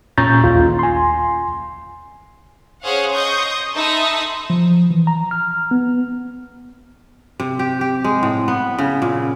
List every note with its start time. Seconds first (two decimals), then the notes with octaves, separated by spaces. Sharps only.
0.18 A#2 C#4 A#5 C#6 G6 A6
0.44 A1 D#2 F4
0.79 G#5 C6
2.83 C#4 G#4 C5 C#5 F5 F#5
3.14 D#5 C6 C#6 D#6 G6
3.74 D#4 A4 E5 B5 C6 D#6
4.50 F3
4.91 E3
5.07 A#5
5.31 F6
5.71 B3
7.40 C3
7.59 G4
7.81 G4
8.04 G#3
8.23 A2
8.48 B3
8.78 C#3
9.02 A#2